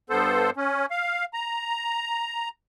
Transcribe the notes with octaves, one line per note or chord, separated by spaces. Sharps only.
G2 B3 A4 C5
C#4
F5
A#5